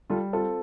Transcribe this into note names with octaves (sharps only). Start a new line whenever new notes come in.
G3 F4 A4
C4 F4 A4